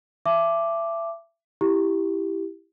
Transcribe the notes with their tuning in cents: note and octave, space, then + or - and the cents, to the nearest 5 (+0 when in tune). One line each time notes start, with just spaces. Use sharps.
E5 +25 A5 -30 D6 +0
E4 +0 G4 +0